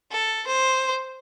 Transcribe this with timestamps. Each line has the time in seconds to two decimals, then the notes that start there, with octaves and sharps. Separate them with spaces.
0.12 A4
0.47 C5